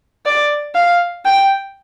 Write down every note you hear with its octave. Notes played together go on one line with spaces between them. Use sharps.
D5
F5
G5